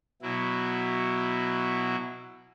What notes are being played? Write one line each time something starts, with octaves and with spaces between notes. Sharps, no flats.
B2 F#3 E4